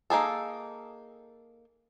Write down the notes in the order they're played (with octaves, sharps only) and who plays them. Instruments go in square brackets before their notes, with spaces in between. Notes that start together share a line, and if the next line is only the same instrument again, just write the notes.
[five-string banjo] A#3 D#4 G#4 A4